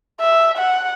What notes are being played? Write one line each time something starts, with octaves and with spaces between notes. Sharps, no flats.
E5
F#5